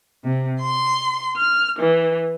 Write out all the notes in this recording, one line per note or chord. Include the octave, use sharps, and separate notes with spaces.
C3
C6
F6
E3